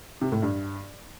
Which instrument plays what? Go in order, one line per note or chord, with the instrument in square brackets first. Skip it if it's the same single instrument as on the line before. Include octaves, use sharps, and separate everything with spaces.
[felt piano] C3
A2
G2